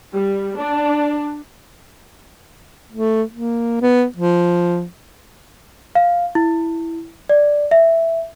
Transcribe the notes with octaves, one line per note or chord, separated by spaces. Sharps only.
G3
D4
A3
A#3
B3
F3
F5
E4
D5
E5